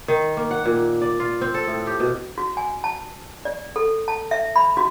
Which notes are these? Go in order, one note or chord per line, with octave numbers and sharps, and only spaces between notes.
D#3
A#3
F#5
A#2
D5
F4
C4
A4
A2
G4
B2
F#4
G#5
A5
D5
A4
A5
E5
B5
F#4